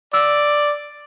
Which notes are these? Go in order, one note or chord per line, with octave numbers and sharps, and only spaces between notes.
D5 E6